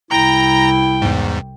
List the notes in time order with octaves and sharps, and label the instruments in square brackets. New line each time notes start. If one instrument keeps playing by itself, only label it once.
[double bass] C2 [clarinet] E4 [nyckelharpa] G5 [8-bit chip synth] A#5 A#6
[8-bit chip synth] E2 G#2